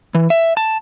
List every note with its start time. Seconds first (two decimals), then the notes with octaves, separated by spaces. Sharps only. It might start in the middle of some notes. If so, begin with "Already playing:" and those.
0.15 E3
0.30 E5
0.57 A5